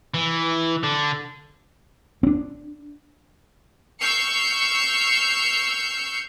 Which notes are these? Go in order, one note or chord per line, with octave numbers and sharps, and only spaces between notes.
E3
D3
C4 D4
C#6 E6 F6 G6 C7 C#7